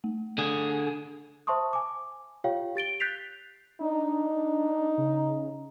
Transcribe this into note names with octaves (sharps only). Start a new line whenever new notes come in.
A3
D3 G#4
C5 E5 A5 C6 C#6 D#6
G#5 D6
F4 G4 C#5 F5 G5
G4 A6 D7 G7
F#6 G6 A6 B6 C7 F7
D4 D#4
C#3